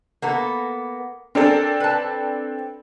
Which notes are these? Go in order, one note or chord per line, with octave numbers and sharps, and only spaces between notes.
A#3 B3 A4
C4 D4 A4 A#4 G#5
B4 A5